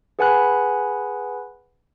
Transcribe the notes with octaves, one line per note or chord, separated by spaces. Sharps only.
G#4 B4 F#5 G#5 B5 F#6